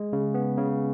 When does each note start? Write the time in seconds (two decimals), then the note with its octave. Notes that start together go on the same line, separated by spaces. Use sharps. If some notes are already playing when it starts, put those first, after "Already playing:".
Already playing: G#3
0.13 C#3
0.34 B3
0.58 C#3